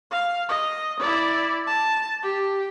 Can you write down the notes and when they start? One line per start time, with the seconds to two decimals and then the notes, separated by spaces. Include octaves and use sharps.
0.11 F5
0.49 D#5
1.00 E4 D5
1.67 A5
2.23 G4